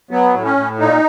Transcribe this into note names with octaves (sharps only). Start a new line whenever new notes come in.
F#3 B3
A2
C#4
A2
A#2 D#4